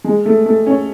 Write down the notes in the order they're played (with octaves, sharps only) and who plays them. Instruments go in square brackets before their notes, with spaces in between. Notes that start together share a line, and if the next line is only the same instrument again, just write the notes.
[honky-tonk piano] G#3
A3
A3
C#4